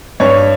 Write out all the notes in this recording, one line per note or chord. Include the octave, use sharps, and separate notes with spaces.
G2 C#5